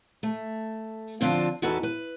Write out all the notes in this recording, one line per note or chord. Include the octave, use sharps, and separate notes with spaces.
A3
D3 F3 C4 D4 F4
E2 D#4 F#4 A4 B4
B4